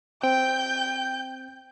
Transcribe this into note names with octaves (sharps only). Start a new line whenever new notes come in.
C4 G5 G6